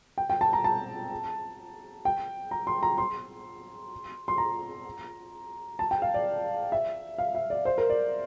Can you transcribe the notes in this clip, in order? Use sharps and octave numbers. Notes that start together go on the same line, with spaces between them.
G5
G5
A5
A#5
A5
G5
A#5
C6
A#5
C6
C6
A#5
A5
G5
F5
D5
E5
F5
E5
D5
C5
A#4
D5